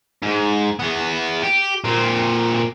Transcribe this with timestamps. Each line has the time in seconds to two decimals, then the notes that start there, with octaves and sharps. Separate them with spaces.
0.22 G#2
0.79 E2 B3
1.43 G4
1.84 A#2 C4